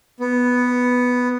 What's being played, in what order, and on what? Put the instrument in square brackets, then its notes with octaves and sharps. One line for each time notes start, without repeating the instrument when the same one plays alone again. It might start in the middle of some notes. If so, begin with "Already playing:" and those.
[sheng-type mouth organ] B3